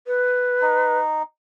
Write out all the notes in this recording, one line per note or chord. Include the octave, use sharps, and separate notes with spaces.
B4
D#4